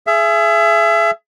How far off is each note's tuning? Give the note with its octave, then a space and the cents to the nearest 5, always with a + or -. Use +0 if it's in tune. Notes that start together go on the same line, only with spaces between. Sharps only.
G#4 +20 E5 +30